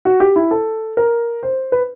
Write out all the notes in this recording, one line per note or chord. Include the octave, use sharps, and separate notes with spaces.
F#4
G4
E4
A4
A#4
C5
B4